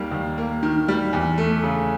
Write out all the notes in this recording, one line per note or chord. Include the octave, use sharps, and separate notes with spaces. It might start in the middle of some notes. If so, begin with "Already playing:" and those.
Already playing: D#2 D#3 G3 A#3
D#2
A#3
D#3
G3
E2
A3
C#3